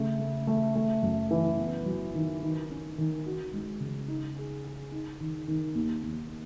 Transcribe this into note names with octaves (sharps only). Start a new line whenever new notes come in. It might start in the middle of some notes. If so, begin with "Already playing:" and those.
Already playing: C#3 A3
A3
A3
A3
F#2
E3
B3
F#3
D#3
D#3
C#4
D#3
F#4
G#3
C#3
D#4
G#4
G#4
D#4
D#3
D#3
D#2
D#2